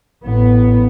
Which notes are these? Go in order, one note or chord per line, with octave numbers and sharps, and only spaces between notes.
A1 B3